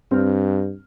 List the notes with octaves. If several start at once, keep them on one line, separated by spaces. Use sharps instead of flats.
G2 C4 F6